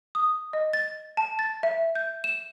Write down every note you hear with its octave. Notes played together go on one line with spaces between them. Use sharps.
D#6
D#5
A6
A5
A6
E5
G6
E7